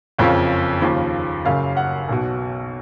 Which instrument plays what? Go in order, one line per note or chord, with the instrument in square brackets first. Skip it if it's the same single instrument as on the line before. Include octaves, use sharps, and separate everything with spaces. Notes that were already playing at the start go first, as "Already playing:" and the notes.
[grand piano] F#1 F2 C#3 F3 C#5
D#2 C#3 F3
F#1 F#2 C#3 F5
F#5
B1 B2